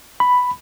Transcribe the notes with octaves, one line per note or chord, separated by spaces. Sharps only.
B5